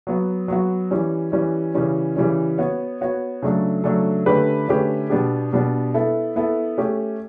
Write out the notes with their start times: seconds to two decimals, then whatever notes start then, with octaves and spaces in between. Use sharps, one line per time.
0.07 F#3 B3 F#4
0.48 F#3 B3 F#4
0.91 E3 G3 C#4
1.32 E3 G3 C#4
1.75 C#3 E3 G3 C#4
2.16 C#3 E3 G3 C#4
2.58 B3 F#4 C#5
3.01 B3 F#4 C#5
3.42 C#3 F#3 A3 D4 A4
3.84 C#3 F#3 A3 D4 A4
4.26 D3 A3 C#4 G4 B4
4.68 D3 A3 C#4 G4 B4
5.10 B2 G3 B3 D4 G4
5.53 B2 G3 B3 D4 G4
5.94 B3 E4 A4
6.36 B3 E4 A4
6.78 A3 C#4 G4